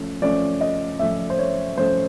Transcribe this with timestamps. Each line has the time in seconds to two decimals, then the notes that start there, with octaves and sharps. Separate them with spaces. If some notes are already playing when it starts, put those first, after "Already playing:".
Already playing: F3 A3 C#4
0.22 F3 A3 C#4 D5
0.61 D#5
0.99 F3 A3 C#4 E5
1.30 C5
1.39 C#5
1.78 F3 A3 C#4 C5